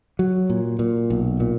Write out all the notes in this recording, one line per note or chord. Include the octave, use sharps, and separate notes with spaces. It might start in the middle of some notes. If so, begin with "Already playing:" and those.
F#3
A#2
A#2
B1
A#2